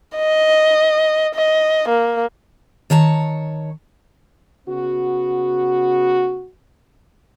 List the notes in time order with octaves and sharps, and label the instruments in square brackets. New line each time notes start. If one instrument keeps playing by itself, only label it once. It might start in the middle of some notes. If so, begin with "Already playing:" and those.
[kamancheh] D#5
D#5
A#3
[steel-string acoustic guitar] D#3 C#5 A5 A#5
[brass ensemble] C#3 B3 F#4